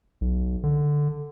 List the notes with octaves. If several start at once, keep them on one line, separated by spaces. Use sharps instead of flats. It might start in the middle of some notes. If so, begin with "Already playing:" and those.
B1
D3